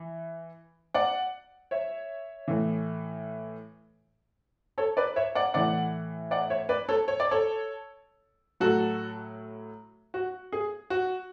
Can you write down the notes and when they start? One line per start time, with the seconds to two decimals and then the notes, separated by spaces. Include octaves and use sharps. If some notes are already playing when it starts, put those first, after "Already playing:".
Already playing: E3
0.94 D5 F#5
1.71 C#5 E5
2.48 A2 E3
4.78 A4 C#5
4.97 B4 D5
5.16 C#5 E5
5.35 D5 F#5
5.54 A2 E3 D5 F#5
6.31 D5 F#5
6.50 C#5 E5
6.69 B4 D5
6.89 A4 C#5
7.08 C#5
7.20 D5
7.31 A4 C#5
8.60 A2 F#3 F#4 A4
10.14 F#4
10.52 G#4
10.90 F#4